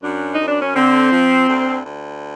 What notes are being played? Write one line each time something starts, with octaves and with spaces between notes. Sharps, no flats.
F#2 D4
F#2 D#4
D4
C#4
D3 C4
F3
D2
D2